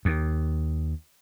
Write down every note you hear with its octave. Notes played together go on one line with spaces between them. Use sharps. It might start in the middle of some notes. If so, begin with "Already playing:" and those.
D#2